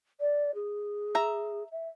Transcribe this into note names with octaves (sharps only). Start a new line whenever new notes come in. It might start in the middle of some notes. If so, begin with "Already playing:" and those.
D5
G#4
E5 A#5
E5